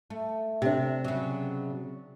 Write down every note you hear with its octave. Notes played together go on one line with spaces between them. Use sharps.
A3
C3 D4
C#3 F#3